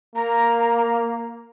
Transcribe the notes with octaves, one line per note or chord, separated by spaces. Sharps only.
A#3 A#5